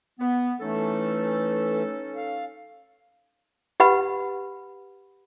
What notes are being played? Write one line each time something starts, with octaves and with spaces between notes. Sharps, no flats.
B3
E3 A3 C#4 D#4 A4
F5
G4 B4 F#5 B5